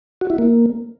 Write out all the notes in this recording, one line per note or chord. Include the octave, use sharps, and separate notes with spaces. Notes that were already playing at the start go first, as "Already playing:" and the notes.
F#4
E4
A#3